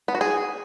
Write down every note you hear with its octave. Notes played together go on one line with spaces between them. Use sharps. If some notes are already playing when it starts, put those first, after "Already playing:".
B3
F#4
G#4